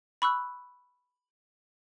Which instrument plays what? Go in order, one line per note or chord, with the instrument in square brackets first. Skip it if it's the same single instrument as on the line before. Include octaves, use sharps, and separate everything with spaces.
[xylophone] B5 C#6 E6 F#6